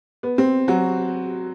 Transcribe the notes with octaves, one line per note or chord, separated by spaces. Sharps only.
B3
C4
F#3 F#4